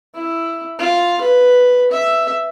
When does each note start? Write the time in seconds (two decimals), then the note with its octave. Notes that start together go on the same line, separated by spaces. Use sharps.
0.15 E4
0.79 F4
1.21 B4
1.91 E5